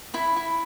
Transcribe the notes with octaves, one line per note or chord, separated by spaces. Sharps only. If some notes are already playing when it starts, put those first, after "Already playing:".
E4 B5
E4